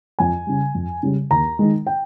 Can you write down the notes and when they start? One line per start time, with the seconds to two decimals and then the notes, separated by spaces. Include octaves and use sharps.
0.19 F2 G#5
0.47 C#3 G3
0.75 F2
1.03 C#3 G3
1.31 D#2 A#5
1.59 D#3 G#3
1.87 G5